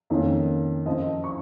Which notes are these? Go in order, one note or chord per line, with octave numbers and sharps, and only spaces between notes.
F2 D#3 A#3 C#4
F#2 F3 C4 D#5
C#6